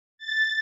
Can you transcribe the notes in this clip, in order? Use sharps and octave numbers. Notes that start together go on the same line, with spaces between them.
A6